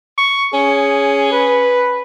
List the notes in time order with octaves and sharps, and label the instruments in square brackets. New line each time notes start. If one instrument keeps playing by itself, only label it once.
[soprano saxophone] C#6
[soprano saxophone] C#4 [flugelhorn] G#4
[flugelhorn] B4